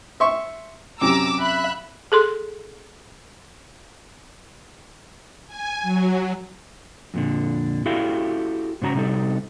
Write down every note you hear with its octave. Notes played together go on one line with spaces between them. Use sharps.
E5 C6 C#6
F#2 C3 G4 A#5 D6 E6
E5 B5 F#6
G#4 A4 C6
G#5
F#3
F2 A#2 D3
E4 F#4 G4 A4 F5
G#2 C#3 F#4 A5 A#5
C3 G3 D#4 A4